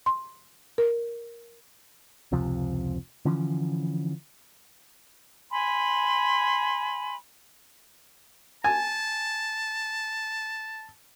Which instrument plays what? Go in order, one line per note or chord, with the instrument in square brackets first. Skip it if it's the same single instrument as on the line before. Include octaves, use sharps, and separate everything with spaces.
[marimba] C6
A#4
[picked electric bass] F1 C#2 C3 F3
D3 E3 F3 C#4
[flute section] G#5 B5 C6
[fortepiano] G#5 [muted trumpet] A5